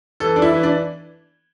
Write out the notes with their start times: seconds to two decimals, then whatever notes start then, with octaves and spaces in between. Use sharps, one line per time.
0.20 E3 A4
0.36 D4
0.42 E4
0.52 E3
0.63 D4